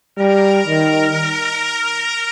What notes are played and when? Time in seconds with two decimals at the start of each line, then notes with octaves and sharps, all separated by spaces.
0.19 G3 A#4
0.67 D#3